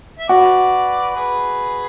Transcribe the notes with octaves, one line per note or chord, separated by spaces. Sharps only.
E5
F#4 B4 D5
G#4 B4